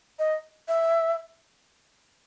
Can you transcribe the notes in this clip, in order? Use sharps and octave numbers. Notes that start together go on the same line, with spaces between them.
D#5
E5